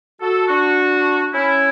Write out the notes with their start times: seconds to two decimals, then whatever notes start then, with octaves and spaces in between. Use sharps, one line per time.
0.20 F#4 A4
0.47 D4 F#4
1.32 C#4 E4